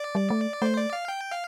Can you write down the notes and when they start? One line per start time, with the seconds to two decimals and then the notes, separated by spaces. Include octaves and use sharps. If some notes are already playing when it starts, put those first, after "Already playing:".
Already playing: D5
0.15 G3
0.30 A3
0.62 A3 C5
0.77 D5
0.93 F5
1.08 G5
1.32 F5